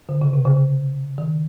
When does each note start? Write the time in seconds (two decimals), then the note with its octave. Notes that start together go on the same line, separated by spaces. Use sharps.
0.09 D3
0.21 C#3
0.33 C3
0.45 C#3
1.18 D#3